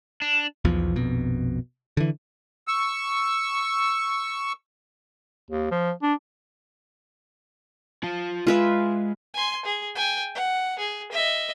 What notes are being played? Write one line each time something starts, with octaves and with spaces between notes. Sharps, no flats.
D4
B1 E2 B2 F3
A#1 F2 B2
D3 E3
C#6 E6
D#2
F3
D4
F4 A5
G#3 F4 B4 E5
G#5 C6
G#4
G5 G#5
F#5
G#4
D#5 E5